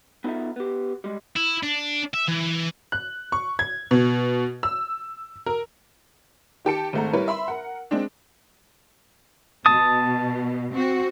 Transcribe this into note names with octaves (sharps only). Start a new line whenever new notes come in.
B3 D#4 F4 A4 E5
B3 G4
G3 G#3
E4
D4
E5
E3
F#6
C#6
G#6
B2
E6
A#4
D#3 G4 A5 C#7
G#1 G#3 A3 F#5 A#5
G3 E4 A#4 B4 C#5
E5 B5 C6
A#4 F#5
G#3 C4 D4
B2 A5 D#6
C4 F#4